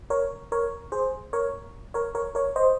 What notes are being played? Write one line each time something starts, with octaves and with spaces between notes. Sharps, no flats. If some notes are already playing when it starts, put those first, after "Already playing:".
A#4 C#5
A#4 C#5
G#4 C5
A#4 C#5
A#4 C#5
A#4 C#5
A#4 C#5
C5 D#5